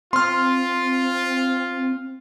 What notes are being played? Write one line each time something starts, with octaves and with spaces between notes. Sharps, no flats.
C4 F4 C6 F6